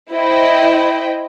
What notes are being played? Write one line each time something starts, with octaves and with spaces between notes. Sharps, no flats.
E4 C5 D#5 G5